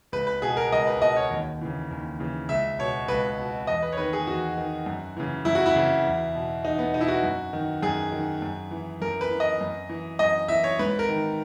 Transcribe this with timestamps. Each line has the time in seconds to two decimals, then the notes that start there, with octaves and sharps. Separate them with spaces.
0.12 C#2 B4
0.27 B4
0.42 B2 G#4
0.57 A#4
0.72 C#2 D#5
0.87 B4
1.02 B2 D#5
1.16 C#5
1.31 D#2
1.61 C#3 E3
1.91 D#2
2.20 C#3 E3
2.49 C#2 E5
2.79 B2 C#5
3.08 C#2 B4
3.38 B2
3.67 E2 D#5
3.82 B4
3.92 C#5
3.97 D#3 B4
4.13 G#4
4.27 E2 F#4
4.57 D#3
4.86 F#2
5.17 C#3 E3
5.45 F#2 E4
5.55 F#4
5.66 E4
5.75 C#3 E3
6.05 E2
6.35 B2
6.64 E2 D#4
6.79 B3
6.94 B2 D#4
7.01 E4
7.08 F#4
7.24 F#2
7.53 D#3
7.83 F#2 G#4
8.12 D#3
8.42 F#2
8.71 E3
9.02 F#2 A#4
9.21 B4
9.30 E3
9.40 D#5
9.61 F#2
9.90 E3
10.19 F#2 D#5
10.48 E3 E5
10.64 C#5
10.79 G#2 B4
10.99 A#4
11.09 D#3